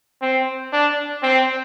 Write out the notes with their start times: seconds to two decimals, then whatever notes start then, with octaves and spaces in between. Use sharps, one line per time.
0.22 C4
0.73 D4
1.23 C4